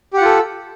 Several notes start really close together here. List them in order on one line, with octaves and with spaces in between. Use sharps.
G4 F#5 F4 A4